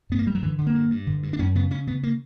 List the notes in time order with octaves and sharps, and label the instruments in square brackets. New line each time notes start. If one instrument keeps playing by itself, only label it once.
[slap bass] G2 B3
A#3
G2 G3
F#3
D3 E3
D3
A#3
G2
G2
D3
G2
D4
F#2 C#4
C#3 B3
C#3 C#4
C#3 B3
A#3